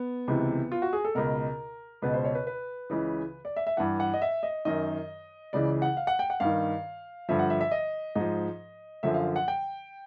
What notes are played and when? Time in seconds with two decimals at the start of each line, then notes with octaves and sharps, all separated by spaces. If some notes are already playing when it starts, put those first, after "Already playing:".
Already playing: B3
0.28 C#2 C3 E3
0.72 F4
0.82 F#4
0.93 G#4
1.04 A4
1.15 C#2 B2 A#4
2.02 C#2 B2 B4
2.14 C5
2.25 C#5
2.35 B4
2.47 B4
2.90 C#2 C#3 E3
3.45 D5
3.56 E5
3.67 E5
3.77 G2 E3 F#5
4.00 F#5
4.14 D#5
4.22 E5
4.43 D#5
4.65 F#2 D#3 D#5
5.53 C#2 C#3 E3 D5
5.82 F#5
5.97 F5
6.07 F#5
6.19 G5
6.30 F#5
6.40 G2 D#3 F5
7.29 G2 D3 F3 E5
7.39 F#5
7.50 E5
7.61 E5
7.71 D#5
8.15 G#2 F3 D#5
9.03 F#2 D3 F3 E5
9.14 F5
9.36 F#5
9.48 G5